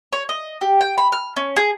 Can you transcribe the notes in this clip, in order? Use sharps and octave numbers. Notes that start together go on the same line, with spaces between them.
C#5
D#5
G4
G5
B5
F6
C#4
G#4